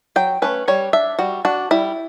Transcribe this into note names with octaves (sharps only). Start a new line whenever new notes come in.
F#3 G5
A3 C#4 B4
G3 C#5
D4 E5
G3 F#4
D4 F#4
G3 E4